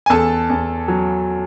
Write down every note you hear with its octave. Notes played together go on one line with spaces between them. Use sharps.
G#5
E2 A4 A5
E2
F#3